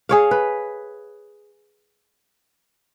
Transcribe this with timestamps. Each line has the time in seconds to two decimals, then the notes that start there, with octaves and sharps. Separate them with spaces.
0.09 G#4 C#5 F5
0.31 B4